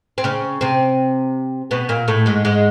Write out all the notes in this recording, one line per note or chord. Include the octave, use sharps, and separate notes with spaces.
C4
C#3 C#4
C3 C4
B2 B3
A#2 A#3
A2 A3
G#2 G#3
G#2 G#3